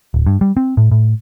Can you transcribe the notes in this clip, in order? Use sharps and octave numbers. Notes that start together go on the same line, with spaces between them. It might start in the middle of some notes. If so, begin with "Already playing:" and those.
D1
G2
G3
C4
A2
A2